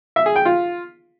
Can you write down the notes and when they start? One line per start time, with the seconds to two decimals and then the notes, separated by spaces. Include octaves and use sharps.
0.16 E5
0.26 G#4
0.36 G5
0.45 F4